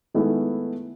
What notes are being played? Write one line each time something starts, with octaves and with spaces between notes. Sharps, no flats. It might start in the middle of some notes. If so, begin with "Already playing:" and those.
D#3 G#3 A3 B3 E4